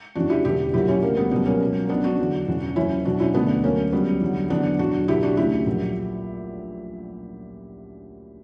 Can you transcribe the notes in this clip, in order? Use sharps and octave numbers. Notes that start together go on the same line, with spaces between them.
F#1 E2 C#3 E3 D4 F#4
E4 G4
E1 E2 D3 E4 G4
B1 A#2 F#3 E4 G4
C#4 E4
D2 D3 F#3 A#3
G3 B3
C#2 B2 F#3 G3 B3
A#3 C#4
C#2 B2 F#3
C#2 C#3 F#3 B3 D4
D4 F#4
E2 D3 F#3
E1 E2 C#3
F#1 E2 C#3 F#3 C#4 E4
E2 B2 F#3 D4 F#4
C#4 E4
E1 D2 D3 B3 D4
D2 D3 F#3 A#3 C#4
C#2 C#3 F#3 G3 B3
E2 D3 F#3
E2 D3 F#3 B3 D4
E1 E2 D3 F#3 D4 F#4
B1 A#2 F#3 E4 G4
D4 F#4
D2 C#3 E3 E4 G4
A#1 A#2 F#3